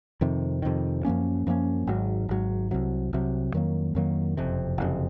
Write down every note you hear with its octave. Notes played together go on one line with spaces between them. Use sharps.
F2 C3 D#3
F2 C3 D#3
F#2 F3 A#3 C#4
F#2 F3 A#3 C#4
G#1 G#2 F#3
G#1 G#2 F#3
C2 C3 F#3
C2 C3 F#3
F2 D#3 F#3 A#3
F2 D#3 F#3 A#3
F#1 F2 C3
F#1 F2 C3